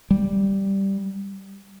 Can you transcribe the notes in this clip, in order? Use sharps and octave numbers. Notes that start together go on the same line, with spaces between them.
G3